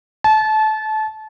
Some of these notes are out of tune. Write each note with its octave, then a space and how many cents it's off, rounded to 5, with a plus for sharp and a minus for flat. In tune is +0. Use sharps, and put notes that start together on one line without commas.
A5 -25